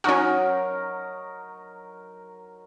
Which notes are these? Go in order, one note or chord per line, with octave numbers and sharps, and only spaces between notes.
F#3 C#4 D#4 F#4 A#4